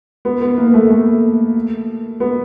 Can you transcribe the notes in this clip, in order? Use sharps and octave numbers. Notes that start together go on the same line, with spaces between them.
B3
B3
A#3
A3
A3
B3